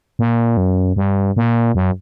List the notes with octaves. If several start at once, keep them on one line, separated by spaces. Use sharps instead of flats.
A#2
F#2
G2
A#2
F#2